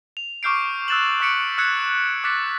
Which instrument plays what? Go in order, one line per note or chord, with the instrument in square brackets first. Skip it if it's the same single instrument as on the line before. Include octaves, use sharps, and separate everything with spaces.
[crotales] F7
C#6 D6 F6 G6 C7 D7
E6 F#6 A6 E7 F#7
C#6 D6 B6 C#7 D7
E6 F#6 G#6 C#7
D6 F#6 A6 B6 C#7